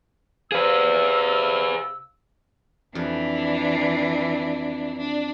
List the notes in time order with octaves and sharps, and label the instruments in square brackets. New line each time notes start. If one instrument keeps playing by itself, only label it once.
[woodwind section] C3 F5 E6 [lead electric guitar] G#4 B4
[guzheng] F2 [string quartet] E3 D4
[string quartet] D4